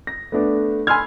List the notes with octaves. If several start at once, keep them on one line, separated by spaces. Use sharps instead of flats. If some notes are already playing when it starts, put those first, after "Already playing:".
A#6
A3 B3 D4
G#5 B5 C6 E6 F6 G#6